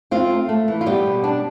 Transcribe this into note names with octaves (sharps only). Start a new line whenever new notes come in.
C4 F4
A3
A3
E3
F4
G3 B3 G4
B2
D4